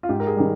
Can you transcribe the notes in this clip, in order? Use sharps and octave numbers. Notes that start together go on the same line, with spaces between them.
F4
G#2 G4
A#4
G#4
D#3 G3